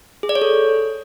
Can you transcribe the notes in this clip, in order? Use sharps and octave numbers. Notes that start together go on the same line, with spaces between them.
G#4
D5
C#5
A4